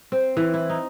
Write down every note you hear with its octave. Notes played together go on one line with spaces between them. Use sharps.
C4
E3
E4
D#4